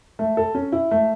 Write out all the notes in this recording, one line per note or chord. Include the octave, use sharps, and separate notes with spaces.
A3
A4
C#4
E4
A3